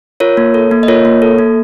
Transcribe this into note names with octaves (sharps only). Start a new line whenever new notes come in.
F4 A#4 C#5
A#3
A4
A#3
D#5
F4 A#4 C#5
A#3
A4
A#3